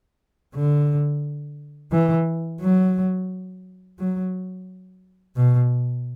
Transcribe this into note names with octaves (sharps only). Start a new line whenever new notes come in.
D3
E3
F#3
F#3
B2